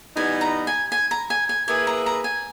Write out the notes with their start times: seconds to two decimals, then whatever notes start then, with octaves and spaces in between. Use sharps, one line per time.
0.16 E3 G3 B3 D#4 G#5
0.41 A#5
0.67 G#5
0.92 G#5
1.11 A#5
1.30 G#5
1.49 G#5
1.68 A#3 E4 G#4 B4 G#5
1.87 A#5
2.06 A#5
2.24 G#5